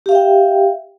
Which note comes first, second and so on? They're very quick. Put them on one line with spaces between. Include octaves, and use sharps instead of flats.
G4 F5 E5 G5